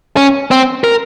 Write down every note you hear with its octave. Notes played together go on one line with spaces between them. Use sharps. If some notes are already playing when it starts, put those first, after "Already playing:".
C#4
C4
A#4